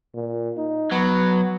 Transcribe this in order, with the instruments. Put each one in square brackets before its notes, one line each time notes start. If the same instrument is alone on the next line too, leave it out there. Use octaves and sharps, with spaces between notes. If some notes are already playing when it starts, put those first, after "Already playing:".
[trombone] A#2
D#4
[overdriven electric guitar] F#3 [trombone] B3